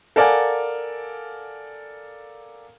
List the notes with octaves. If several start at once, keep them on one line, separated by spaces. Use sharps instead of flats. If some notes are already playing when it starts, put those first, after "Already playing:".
A4 A#4 D5 F5 F#5 G#5